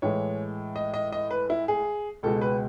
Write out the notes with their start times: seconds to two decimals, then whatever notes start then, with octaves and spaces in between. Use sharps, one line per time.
0.02 A2 E3 G#3 C#5
0.76 D#5
0.94 D#5
1.12 D#5
1.31 B4
1.50 E4
1.68 G#4
2.23 C#2 B2 G#3 A4
2.41 B4